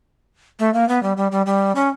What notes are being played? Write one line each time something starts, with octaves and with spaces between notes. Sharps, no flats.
A3
A#3
B3
G3
G3
G3
G3
C#4